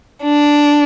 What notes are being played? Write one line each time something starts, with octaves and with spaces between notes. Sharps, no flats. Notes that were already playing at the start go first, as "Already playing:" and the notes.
D4